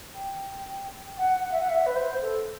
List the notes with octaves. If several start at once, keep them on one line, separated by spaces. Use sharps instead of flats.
G5
F#5
F#5
E5
F#5
E5
B4
C5
A4